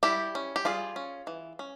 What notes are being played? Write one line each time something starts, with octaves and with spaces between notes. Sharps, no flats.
G3 E4 G4
C#4
G4
G3 F4 G#4
C#4
E3
C#4